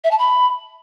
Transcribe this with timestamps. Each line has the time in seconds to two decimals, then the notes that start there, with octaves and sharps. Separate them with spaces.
0.04 E5
0.11 A5
0.18 B5